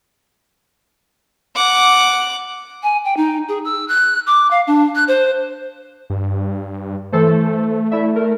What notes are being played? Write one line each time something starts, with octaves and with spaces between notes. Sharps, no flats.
F#5 D6
G#5
G5
D#4
G#4
E6
F#6
D6
F5
D4
F#6
C5
G2
E3 A3 A4 C5
E4 D5 E5
A3 A#4